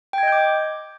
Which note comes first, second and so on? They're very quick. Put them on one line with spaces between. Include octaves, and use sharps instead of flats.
G5 G#6 D#5 G6 D6